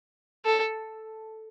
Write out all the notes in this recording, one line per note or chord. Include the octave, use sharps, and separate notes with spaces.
A4